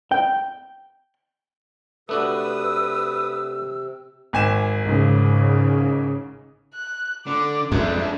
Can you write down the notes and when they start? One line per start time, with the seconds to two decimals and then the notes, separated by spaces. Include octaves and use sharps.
0.11 G5
2.09 C3 A3 D4 F#4 B4 D#6 E6
4.33 G#1 G#5 E7
4.81 G#2 C#3
6.74 F#6
7.27 D3 D6
7.72 F2 G#3 D4 E5